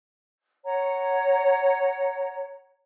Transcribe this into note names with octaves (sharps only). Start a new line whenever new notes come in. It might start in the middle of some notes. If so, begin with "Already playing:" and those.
C#5 F#5 A#5